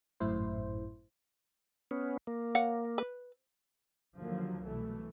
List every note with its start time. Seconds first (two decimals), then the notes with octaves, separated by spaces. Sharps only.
0.20 G#1 F#2 A2 E4 C5
1.91 B3 C#4
2.27 A#3
2.55 C#5 F5 F#5
2.98 B4
4.16 D#2 D3 F3 F#3 A#3
4.64 C2 B2 E3 A3